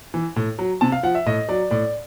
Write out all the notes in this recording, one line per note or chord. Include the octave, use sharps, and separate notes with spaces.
E3
A2
F#3
C3 A5
F5
F3 F#5
E5
A2 D#5
F#3 D5
A2 D5